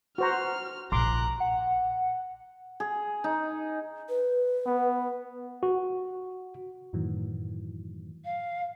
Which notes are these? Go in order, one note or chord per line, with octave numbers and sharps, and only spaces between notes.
F#4 C5 A#5 F6
A#1 A#5 C6 D6 F#6
F#5
G#4
D#4
B4
B3
F#4
F#2 A2 D#3 E3 F#3
F5